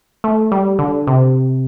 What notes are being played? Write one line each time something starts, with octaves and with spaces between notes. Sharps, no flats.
A3
G3
D3
C3